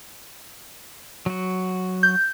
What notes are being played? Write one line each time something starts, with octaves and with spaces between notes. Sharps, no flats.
F#3 F#4
G6